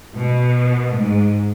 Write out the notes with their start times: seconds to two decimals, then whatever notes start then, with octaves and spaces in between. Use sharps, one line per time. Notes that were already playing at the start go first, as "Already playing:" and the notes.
0.14 B2
0.95 G#2